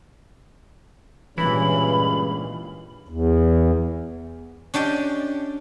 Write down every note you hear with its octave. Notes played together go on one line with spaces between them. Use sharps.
C#2 G2 A#2 E3 C#4 B5
E2
C#4 D4 G4 D5 G5